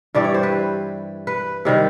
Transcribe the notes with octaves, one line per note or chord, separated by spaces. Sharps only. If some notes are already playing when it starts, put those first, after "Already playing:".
G2 E3 G3 D5
C#5
C5
B4
B4
C3 D#3 G3